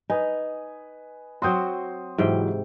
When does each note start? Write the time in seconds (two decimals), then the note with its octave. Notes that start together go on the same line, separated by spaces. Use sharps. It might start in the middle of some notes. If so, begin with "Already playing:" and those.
0.10 D#4 B4 D#5 G#5
1.42 F#3 C4 F#4 C6 D#6 G6
2.18 G#2 C3 E3 F#3 G5